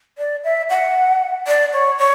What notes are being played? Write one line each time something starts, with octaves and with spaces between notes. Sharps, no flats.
D5
E5
F#5
D5
C#5
C#5